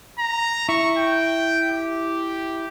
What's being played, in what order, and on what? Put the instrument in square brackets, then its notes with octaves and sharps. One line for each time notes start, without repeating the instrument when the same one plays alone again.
[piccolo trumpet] A#5
[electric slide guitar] E4 [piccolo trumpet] C#6
[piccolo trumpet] G5
G4